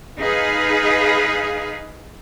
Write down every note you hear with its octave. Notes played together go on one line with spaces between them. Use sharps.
D#4 G#4 B4 F5